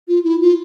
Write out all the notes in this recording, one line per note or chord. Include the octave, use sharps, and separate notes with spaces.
F4
E4
F4